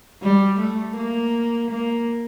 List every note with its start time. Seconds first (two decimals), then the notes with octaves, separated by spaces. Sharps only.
0.23 G3
0.60 A3
0.97 A#3
1.70 A#3